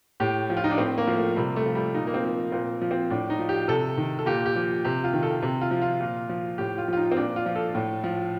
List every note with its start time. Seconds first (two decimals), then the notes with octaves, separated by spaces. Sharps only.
0.20 A2 G4
0.50 F3
0.57 F4
0.64 D#4
0.71 D4
0.78 A2 C4
0.98 A#3
1.07 F3
1.17 A3
1.36 C3 G3
1.56 A3
1.66 F3
1.75 G3
1.95 A#2 D#4
2.07 A#3
2.14 C4
2.24 F3
2.52 A#2 C4
2.81 F3
2.91 C4
3.10 A2 D4
3.30 D#4
3.39 F3
3.49 G4
3.68 C3 A4
3.97 D#3
4.19 A4
4.26 A#2 G4
4.46 G4
4.56 F3
4.85 C3 G4
5.04 F4
5.13 D#3
5.23 A4
5.42 C3
5.61 F4
5.71 F3
5.82 F4
6.00 A#2
6.29 F3
6.58 A2 G4
6.78 F4
6.88 F3 F4
6.97 D#4
7.12 C4
7.17 A#2 D4
7.36 F4
7.46 F3
7.56 A4
7.74 A2
8.04 F3